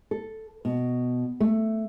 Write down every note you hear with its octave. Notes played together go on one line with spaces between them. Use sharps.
A4
B2
A3